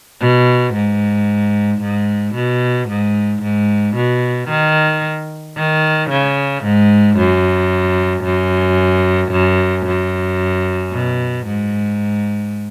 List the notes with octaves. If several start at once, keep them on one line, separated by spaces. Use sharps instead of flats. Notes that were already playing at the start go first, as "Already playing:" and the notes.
B2
G#2
G#2
B2
G#2
G#2
B2
D#3
D#3
C#3
G#2
F#2
F#2
F#2
F#2
B2
G#2